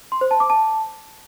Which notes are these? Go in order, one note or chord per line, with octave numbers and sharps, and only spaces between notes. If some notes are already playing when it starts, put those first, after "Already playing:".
C6
C5
A5
D6
A5